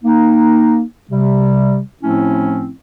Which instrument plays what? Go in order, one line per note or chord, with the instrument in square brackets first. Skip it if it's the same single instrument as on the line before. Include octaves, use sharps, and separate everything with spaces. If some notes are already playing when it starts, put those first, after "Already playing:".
[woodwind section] A#3 D#4
C3 G3
A2 F3 A3 C4 C#4 E4